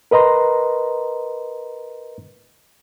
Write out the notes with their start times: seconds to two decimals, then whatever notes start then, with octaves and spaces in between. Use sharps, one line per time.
0.11 A#4 B4 D#5 A#5 C6